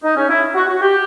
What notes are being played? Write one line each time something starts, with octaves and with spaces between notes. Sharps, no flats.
D#4
C#4
E4
F#4
F#4
G4